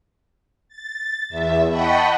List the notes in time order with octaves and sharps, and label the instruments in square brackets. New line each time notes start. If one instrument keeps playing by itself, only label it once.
[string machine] A6
E2 E5
D#5 F#5 G5 A5 B5 C#6